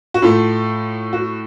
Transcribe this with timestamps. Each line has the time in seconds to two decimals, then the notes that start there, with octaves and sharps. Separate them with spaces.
0.14 F#4
0.22 A2 A3 F4
1.13 F#4